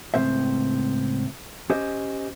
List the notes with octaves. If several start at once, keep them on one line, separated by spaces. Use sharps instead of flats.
C#2 A2 E3 C4 C5 E5
C#4 G4 C5 D#5